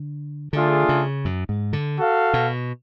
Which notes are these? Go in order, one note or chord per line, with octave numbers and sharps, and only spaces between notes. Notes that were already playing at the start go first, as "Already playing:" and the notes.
Already playing: D3
D3 A3 D4 F4 G#4
C#3
F#2
G#2
D3
F#4 A4 F5
B2